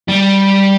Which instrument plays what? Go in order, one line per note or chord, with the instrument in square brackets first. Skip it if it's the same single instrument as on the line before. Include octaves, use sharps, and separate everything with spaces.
[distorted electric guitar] G3